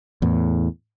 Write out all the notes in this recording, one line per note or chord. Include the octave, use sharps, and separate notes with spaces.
E2 A2